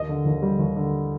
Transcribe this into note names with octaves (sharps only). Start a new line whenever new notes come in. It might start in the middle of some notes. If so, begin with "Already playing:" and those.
Already playing: D#2 D#5
D3
D#2
G3
D#2
D3